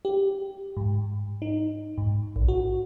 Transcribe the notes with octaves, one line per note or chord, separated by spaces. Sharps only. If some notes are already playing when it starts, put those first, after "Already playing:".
G4
G#2
D#4
G#2
A#1
F#4